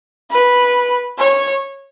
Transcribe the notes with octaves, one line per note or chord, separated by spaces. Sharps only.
B4
C#5